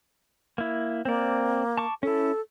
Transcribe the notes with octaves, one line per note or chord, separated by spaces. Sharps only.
A#3 E4
A#3 C4 D5
A5 C#6 D6
C#4 E4 A4